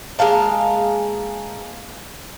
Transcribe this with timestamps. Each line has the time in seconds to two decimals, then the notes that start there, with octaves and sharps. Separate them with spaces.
0.19 G#3 A#3 F5 A5